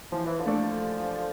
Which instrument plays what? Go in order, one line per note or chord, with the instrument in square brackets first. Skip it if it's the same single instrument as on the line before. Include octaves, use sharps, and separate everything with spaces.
[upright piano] E3 [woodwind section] F3
[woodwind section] E3
D3 F3
[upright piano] A3 D4 A4 D5